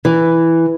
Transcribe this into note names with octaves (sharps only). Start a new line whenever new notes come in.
E3